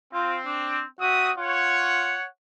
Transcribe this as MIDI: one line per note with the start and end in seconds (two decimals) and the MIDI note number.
0.13 0.86 60
0.13 0.37 65
0.46 0.80 62
1.00 1.31 60
1.00 1.32 66
1.00 1.31 76
1.00 1.31 87
1.37 2.15 65
1.37 2.27 73
1.37 2.27 78